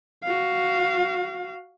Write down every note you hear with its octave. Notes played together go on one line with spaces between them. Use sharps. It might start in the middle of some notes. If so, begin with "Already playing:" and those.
F#4 F5